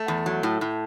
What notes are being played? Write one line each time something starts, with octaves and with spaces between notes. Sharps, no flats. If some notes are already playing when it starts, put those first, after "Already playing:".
Already playing: A3
E2
F#3
A2
A2